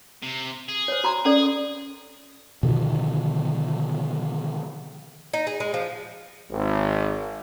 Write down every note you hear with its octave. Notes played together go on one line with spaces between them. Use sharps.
C3
G#4
C5 C#5
F#4 A#5 C6
C#4 G#4 A4 D5
B2 D3 D#3 F3
D#4
G#4
G#3
F3
G#1